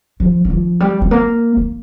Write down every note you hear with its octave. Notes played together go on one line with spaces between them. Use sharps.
F3
D#3
F3
G3
G3
A#3
A#3